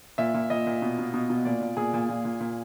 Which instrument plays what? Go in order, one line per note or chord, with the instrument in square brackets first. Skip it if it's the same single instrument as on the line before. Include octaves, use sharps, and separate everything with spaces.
[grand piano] A#2 E5
A#2
A#2 D#5
A#2
B2
B2
B2
B2
A#2 D5
A#2
A#2 G#4
A#2
A#2
A#2
A#2